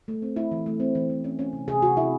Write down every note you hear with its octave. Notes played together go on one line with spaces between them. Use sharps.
A3
C4
A3 E4
E3
A3
C4
E3
E3
C#4
C#4
C3
C3 G#4
C3 F#4
C3 E4